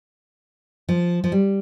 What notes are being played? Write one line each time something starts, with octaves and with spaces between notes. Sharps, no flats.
F3
F3
G3